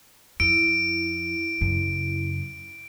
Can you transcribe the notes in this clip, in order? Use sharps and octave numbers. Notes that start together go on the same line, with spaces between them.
F2 E4 D7
F#2 C#3